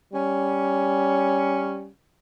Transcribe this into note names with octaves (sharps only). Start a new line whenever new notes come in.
G3 C#4